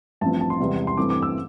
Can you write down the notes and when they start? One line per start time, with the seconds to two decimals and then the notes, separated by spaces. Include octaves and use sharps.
0.21 A1 G2 F3 C4 A5
0.41 A5
0.50 C6
0.60 E1 E2 C3 G3 B3
0.87 C6
0.97 G2 E3 A3 C4 D6
1.10 D6
1.22 E6